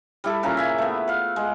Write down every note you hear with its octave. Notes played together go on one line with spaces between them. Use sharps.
G3 E4 A4
A#2 C#3 A#4 A#5
E5 G#5
A3 B3
F5 F#5
G#3